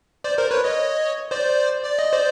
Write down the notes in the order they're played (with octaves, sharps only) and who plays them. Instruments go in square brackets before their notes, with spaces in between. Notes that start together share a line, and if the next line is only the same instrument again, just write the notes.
[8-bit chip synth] C5 D5
A#4 C5
B4 C#5
C#5 D#5
C5 D5
D5
D#5
C5 D5